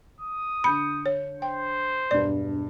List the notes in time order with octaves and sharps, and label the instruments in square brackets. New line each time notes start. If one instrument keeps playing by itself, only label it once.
[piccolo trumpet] D#6
[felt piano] D3 G6 C#7 [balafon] B5
[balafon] C#5
[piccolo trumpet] C5 [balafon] G5
[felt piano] E1 G2 [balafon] D5